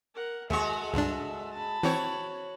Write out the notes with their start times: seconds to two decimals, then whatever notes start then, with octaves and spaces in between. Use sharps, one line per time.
0.15 A#4 F#5
0.50 D#2 G#3 F#4 A4 E5 C#6
0.94 C#2 G2 D4
1.53 A5 B5
1.83 E3 C4 F#4 C#5